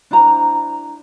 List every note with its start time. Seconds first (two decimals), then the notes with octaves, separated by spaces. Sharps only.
0.11 D4 E4 C5 A#5